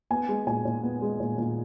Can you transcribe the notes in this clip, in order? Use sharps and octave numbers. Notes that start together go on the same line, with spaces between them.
B3 G#5
G#3
A#2 G#5
A#2
B3
G#3
A#2
A#2